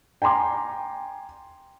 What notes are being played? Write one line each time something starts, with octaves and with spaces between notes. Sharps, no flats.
G5 G#5 A#5 C6 D6